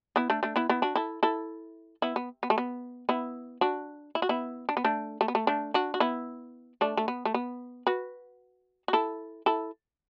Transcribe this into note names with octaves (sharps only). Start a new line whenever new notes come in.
B3 E4
A3 D4
A3 D4
B3 E4
B3 E4
D4 F#4
E4 A4
E4 A4
B3 E4
B3
B3
A3
B3
B3 E4
D4 F#4
E4
F#4
B3 E4
D4
B3
A3 D4
A3
B3
A3
A3 D4
D4 F#4
F#4
B3 E4
A3 D4
A3
B3
A3
B3
F#4 B4
F#4
E4 A4
E4 A4